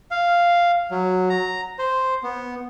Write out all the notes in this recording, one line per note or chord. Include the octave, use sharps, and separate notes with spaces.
F5
F#3
A#5
C5
B3